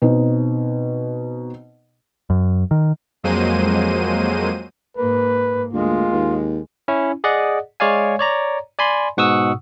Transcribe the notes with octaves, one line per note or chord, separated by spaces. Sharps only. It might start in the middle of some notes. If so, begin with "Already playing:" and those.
B2 C4 D#4
F#2
D#3
F2 F#3 G#3 A#3 C5 D#7
G#2 A#3 B4
D2 G#3 A#3 F4
D#2
C#4 E4
G#4 D5 D#5 F#5
G#3 C#5 D5 F5 G#5
C#5 D5 A#5
D5 G#5 B5 C6
G#2 B2 F#5 C#6 D#6 E6